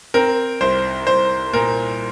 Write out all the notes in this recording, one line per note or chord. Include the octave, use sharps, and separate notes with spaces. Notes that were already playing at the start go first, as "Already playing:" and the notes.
C4 A#4
C2 C5
C2 C5
A#2 A#4